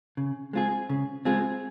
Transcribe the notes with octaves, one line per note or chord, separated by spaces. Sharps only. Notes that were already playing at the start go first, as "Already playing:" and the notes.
C#3
G#3 C4 F4 G#4
C#3
G#3 C4 F4 G#4